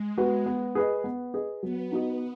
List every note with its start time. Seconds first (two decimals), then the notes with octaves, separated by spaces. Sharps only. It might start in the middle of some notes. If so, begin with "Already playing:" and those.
Already playing: G#3
0.18 B3 F#4 B4
0.46 B3
0.75 G#4 B4 D#5
1.04 B3
1.34 G#4 B4 D#5
1.63 F#3 B3
1.92 D#4 F#4 D#5